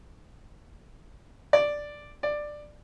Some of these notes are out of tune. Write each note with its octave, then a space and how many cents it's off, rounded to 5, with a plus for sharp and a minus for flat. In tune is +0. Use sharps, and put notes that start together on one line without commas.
D5 +0
D5 +10